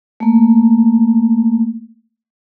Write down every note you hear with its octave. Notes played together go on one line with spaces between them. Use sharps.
A3 A#3